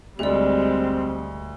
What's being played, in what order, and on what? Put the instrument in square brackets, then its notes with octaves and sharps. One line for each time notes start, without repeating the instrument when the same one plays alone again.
[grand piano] D2 [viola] G3 G#3 [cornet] C4 [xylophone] G#4 D5